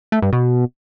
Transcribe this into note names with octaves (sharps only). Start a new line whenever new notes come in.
A3
G2
B2